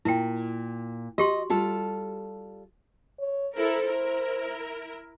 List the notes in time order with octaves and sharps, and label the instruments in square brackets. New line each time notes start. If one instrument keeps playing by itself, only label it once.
[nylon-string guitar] A#2 [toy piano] E4 G5
[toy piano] F#4 G4 C6 [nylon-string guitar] D#5
[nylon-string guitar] G3 F4 A4
[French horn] C#5
[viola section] E4 A4 A#4 [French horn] C5
[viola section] E4 A#4